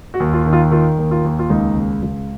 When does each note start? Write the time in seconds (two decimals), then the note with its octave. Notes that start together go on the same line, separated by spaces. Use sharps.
0.14 F#4
0.20 D#2
0.33 F4
0.46 D#3
0.53 F4
0.71 D#3 F4
0.98 D#2
1.11 F4
1.25 D#2
1.39 F4
1.50 C#2 D#4
1.76 C#3
2.03 C#2